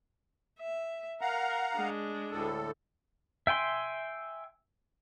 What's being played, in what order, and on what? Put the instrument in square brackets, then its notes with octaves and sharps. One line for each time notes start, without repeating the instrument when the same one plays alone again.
[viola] E5
[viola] A#4 [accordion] F5 F#5 A#5
[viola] G#3 D4
[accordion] D2 A2 A4
[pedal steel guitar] E5 G5 G#5 C6